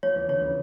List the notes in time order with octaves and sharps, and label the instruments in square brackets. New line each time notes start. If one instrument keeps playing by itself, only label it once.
[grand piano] F3 [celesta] C#5
[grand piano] E3
[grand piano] D3 [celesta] C#5
[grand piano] C#3 E3